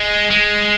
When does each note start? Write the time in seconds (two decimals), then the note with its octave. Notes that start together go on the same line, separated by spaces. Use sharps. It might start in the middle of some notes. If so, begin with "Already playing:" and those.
Already playing: G#3
0.31 G#3